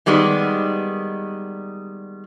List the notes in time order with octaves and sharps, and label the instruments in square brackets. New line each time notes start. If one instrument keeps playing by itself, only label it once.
[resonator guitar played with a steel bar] D#3 G3 G#3 B3